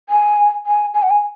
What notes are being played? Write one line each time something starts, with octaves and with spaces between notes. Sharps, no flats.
G#5
G#5
G#5
F#5
G#5